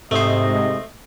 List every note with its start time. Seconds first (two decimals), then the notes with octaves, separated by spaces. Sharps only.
0.11 G#2 C3 A3 C5 D#5